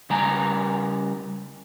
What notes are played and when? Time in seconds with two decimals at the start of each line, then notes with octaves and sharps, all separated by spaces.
0.10 C#3 G3 G5 G#5 A#5